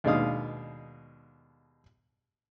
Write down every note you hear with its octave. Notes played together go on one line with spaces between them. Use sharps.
D#2 B2 G#3 D4 F5 D#6